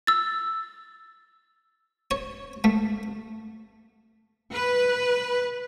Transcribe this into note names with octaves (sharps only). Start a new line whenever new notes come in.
E6 A6
C#5
A3
B4